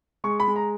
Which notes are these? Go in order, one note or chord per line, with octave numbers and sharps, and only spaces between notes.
G#3 C#6
B5
G#3
A#5